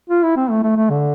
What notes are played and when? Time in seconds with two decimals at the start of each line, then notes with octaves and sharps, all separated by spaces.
0.10 F4
0.23 E4
0.36 C4
0.50 A3
0.63 A3
0.76 A3
0.90 D3